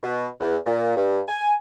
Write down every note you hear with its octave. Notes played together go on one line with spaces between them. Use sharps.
B2
E2
A#2
G2
G#5